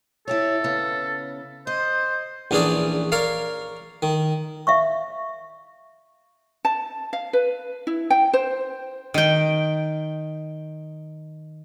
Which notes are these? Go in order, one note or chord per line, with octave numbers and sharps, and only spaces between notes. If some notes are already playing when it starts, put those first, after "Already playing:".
E4 G4 A4 C#5
C#3 B3
C5 D#5
A#1 E3 C#4 D4 G#4 D5
A#4 C#5 D5 F5
D#3
E5 F5 C#6
A5
F5
B4
E4
G5
C5
D#3 G5